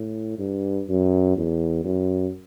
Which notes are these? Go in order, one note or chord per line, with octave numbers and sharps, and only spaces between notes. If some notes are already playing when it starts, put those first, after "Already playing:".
Already playing: A2
G2
F#2
E2
F#2